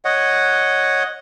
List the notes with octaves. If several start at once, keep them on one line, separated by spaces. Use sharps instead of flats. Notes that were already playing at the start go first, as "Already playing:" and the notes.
C#5 D#5 F#5